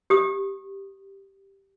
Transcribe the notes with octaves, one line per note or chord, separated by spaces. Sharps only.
G4 D#6